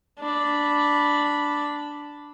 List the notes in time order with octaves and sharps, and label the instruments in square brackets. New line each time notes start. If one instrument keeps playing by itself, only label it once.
[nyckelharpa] D4 B5